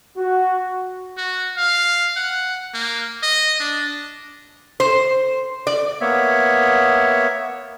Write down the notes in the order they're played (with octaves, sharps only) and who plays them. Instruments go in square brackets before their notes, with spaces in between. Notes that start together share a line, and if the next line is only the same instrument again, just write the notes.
[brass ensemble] F#4
[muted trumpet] F#4
F5
F#5
A#3
D#5
D4
[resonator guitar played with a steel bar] C5
D5
[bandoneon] A#3 B3 C#5 E5